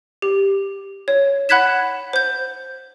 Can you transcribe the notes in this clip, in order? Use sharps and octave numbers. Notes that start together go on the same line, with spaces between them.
G4
C#5
F#5 B5 F#6 G#6 B6 E7
C5 G6